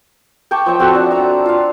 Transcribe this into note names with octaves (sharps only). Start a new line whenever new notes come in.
G5 A5 C#6 D6
F3 C#5 E5 G5
C4 F#4 A4 F#5
D4
A#5 E6
F4 F5